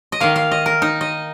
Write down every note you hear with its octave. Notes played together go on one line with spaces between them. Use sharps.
D#5
D#3 A#3 F5
F5
D#5
A#4
D#4
D#5